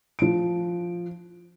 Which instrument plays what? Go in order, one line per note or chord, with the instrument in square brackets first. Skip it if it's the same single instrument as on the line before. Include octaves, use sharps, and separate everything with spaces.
[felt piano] F3 D7